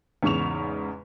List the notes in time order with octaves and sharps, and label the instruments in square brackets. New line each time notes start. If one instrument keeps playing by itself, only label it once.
[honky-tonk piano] E2 G#2 C#3 C#6 E7 F7